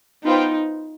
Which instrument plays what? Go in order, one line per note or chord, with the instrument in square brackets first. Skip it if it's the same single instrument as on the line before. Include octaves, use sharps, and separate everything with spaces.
[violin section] B3 F4 C5 G5 [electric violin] D#4